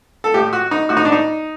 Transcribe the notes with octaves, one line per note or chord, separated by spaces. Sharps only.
A4
A2 G4
F#4
D#4
A2 F#4
D#4
D4
D#4